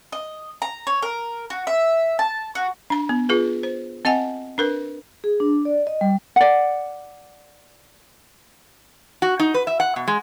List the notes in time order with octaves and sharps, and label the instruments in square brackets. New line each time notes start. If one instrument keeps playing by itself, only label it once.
[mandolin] D#5
A#5
C#5
A#4
F#4
E5
A5
F#4
[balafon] D4 A#5
B3
F4 G#4 B4
C5
C4 D#5 F#5 G#5
D4 A#4 B4
[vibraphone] G#4
D4
D5
D#5
G3
[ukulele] D5 F#5
[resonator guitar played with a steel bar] F#4
D#4
B4
E5
F#5
B2
G#3